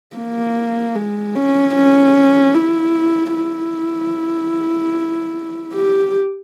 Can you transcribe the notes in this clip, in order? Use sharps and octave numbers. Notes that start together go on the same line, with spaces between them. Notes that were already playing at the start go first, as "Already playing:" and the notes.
A#3
G#3
C#4
C#4
E4
E4
G4